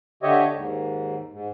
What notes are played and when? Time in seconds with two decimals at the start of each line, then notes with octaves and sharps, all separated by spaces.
0.23 D3 G4 C#5 D#5 E5
0.55 D#2 G#2
1.32 G#2